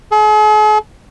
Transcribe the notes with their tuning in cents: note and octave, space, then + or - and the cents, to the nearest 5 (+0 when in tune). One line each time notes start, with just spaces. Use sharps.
G#4 +45